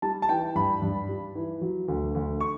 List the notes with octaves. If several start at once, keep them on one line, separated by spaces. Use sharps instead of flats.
G3 A5
A5
E3 G5
G2 B5
G2
G3
E3
F#3
D2
D2
C#6